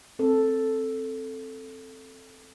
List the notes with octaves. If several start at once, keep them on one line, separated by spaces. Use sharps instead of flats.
C4 A4